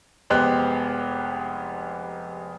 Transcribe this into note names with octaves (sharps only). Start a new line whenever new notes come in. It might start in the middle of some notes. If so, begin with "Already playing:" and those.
F1 G#3 B3 G4 C5 F#6